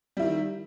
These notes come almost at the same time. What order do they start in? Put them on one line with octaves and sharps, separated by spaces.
G3 E4 D#3